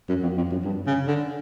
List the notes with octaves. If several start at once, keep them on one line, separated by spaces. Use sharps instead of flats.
F#2
F2
F2
F#2
G2
C#3
D3